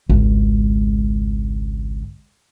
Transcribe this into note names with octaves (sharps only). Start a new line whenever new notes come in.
G#1 C#2